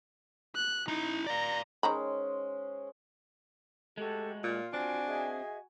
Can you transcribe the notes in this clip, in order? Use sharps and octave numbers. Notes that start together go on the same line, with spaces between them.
F#6
D#4 E4 A#5
D5 F5 A#5
D#3 G#3 C#4 C5 A#5 B5
G#3 A3 F#4 G4 A4
A#2 F4
C4 D4 F#4 G#5
G#4 D#5 E5